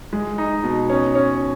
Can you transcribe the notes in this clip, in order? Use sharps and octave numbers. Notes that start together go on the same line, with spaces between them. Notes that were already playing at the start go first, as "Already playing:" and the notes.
G#3
D#4
B2
C#4
C#4